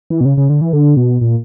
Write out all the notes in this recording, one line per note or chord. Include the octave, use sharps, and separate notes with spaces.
E3
B2
C#3
C#3
D3
E3
D3
B2
A#2